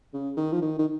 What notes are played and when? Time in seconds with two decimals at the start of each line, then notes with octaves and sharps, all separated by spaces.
0.14 C#3
0.37 D#3
0.53 F3
0.62 D#3
0.79 D#3